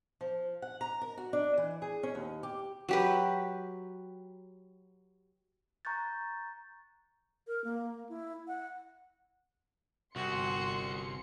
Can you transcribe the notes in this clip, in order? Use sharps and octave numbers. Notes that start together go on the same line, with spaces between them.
F3
F#5
A#5
A#4
F#4
D4
E3
G#4
C#4
D#2
G4
F#3 G4 B4
A#5 C#6 F#6 G6 A6
A#4
A#3
E4
F#5
G1 C2 F#4 C6 C#7